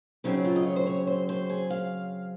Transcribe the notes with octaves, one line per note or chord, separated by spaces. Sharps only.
F#2 C#3 F#3 C4 D#4
F4
D#5
C#5
C5
C#5
C5
C5
G#4
F5